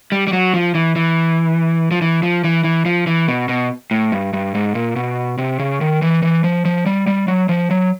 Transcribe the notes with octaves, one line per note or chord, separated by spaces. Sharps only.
G3
G3
F#3
F3
E3
E3
F3
E3
F3
E3
E3
F3
E3
B2
B2
A2
G2
G2
G#2
A#2
B2
C3
C#3
D#3
E3
E3
F3
F3
G3
G3
F#3
F3
F#3